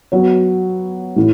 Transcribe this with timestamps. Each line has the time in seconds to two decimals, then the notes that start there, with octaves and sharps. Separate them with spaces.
0.12 F#3 B3 F#4 C#5
1.16 A2 E3